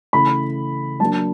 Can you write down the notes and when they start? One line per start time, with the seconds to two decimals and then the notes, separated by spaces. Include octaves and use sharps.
0.13 C#3 E3 A3 B5
1.00 F#3 A#3 D4 A5